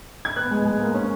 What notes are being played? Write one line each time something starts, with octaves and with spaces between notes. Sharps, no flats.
G#6
B3 F#6
G#3
G#3
A#3
C#4